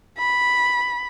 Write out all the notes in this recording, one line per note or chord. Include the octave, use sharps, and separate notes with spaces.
B5